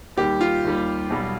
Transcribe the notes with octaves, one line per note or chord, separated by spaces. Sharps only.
D#2 D#3 G3 G4
F4
D#2 D#3 G3
B1 B2 G3